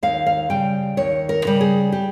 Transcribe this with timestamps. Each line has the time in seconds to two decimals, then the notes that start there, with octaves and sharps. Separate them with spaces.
0.03 D#2 F5
0.26 F5
0.50 C#3 G3 G5
0.97 D#2 C#5
1.29 A#4
1.45 C#3 G3
1.61 G#4
1.92 G4